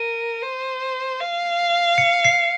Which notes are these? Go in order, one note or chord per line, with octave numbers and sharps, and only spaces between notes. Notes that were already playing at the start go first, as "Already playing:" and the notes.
Already playing: A#4 D#7
C5
F5
C#7
C7